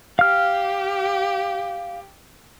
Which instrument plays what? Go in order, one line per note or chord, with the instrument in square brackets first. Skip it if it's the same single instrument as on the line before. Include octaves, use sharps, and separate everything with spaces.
[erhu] G4 [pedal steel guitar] F5 F6